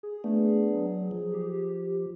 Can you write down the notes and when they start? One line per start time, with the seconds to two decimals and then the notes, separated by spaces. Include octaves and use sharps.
0.03 G#4
0.24 A3 B3 D4
0.73 F#3
1.11 F3
1.33 G4